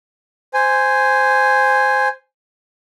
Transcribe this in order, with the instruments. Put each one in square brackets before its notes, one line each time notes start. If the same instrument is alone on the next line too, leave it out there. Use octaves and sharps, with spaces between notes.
[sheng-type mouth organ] C5 G#5